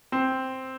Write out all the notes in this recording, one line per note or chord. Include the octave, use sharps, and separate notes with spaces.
C4